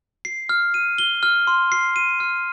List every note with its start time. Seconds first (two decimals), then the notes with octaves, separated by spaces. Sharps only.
0.25 C7
0.49 F6
0.74 D#7
0.98 G7
1.23 F6
1.47 C6
1.72 C7
1.96 D#7
2.20 F6